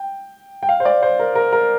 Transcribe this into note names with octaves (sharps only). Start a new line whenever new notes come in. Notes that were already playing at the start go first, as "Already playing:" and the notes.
Already playing: G5
G5
F5
C5
D5
C5
A#4
A#4
A#4